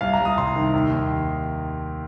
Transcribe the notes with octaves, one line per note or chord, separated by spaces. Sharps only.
C2 F5
A#5
C2
D#6
C3 C6
D#3
D#2
D#2